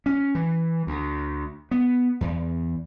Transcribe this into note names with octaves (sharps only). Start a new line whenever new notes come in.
C#4
E3
D2
B3
E2